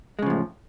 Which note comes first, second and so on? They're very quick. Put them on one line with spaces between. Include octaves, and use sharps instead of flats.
G#3 C#3 F3 A2